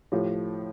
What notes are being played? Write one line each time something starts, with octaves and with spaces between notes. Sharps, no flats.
A2 F3 A3 G4